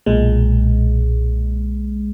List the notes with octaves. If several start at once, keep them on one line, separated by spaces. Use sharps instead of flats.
B1 A#2 G#3